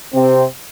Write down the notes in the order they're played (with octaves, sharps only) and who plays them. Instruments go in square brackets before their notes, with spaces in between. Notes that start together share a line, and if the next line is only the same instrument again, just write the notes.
[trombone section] C3 C4